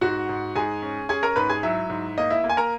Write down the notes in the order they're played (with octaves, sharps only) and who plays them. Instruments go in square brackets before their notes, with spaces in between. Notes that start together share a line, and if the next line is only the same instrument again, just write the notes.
[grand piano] G#2 F#4 F#5
G#2
G#2 G#4 G#5
C#4
C#4 G#4 G#5
A#4 A#5
G#2 B4 B5
G#4 G#5
F#3 E4 E5
G#2
A#3 D#5
E4 E5
A#3
G#5
A#4 A#5